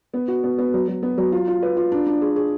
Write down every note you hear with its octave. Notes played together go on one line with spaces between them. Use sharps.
B3
F#4
B3
B3
F#3
F#3
B3
F#3
F4
F4
B4
F4
D4
D4
G#4
G#4